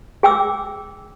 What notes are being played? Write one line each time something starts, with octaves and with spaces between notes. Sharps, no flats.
G#4 G5 D6 E6